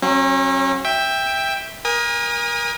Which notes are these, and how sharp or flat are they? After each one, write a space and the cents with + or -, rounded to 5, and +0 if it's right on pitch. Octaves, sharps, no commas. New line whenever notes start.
F#3 +0 C#4 -40
E5 -5 G5 +15
A#4 +30 G#5 -30 D#6 +0